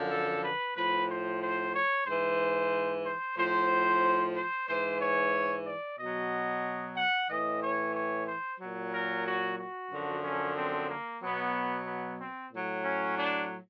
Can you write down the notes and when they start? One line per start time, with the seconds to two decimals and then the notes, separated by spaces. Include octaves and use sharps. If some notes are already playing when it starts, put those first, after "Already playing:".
Already playing: F#2 D3 F3
0.10 A4
0.43 B4
0.76 A2 F3 B4
1.09 C5
1.42 C5
1.73 C#5
2.06 G#2 E3 C5
3.05 C5
3.37 A2 F3 C5
4.35 C5
4.68 G#2 E3 C5
5.00 C#5
5.66 D5
5.98 B2 F#3 D#5
6.96 F#5
7.29 A2 E3 D#5
7.62 C#5
7.95 C#5
8.27 C5
8.59 A#2 F#3
8.93 A#4
9.26 F#4
9.58 F#4
9.91 F#2 D3 F3
10.23 C#4
10.56 C4
10.89 A#3
11.22 B2 F#3 B3
11.86 B3
12.19 C4
12.51 A2 F#3
12.84 C#4
13.17 D4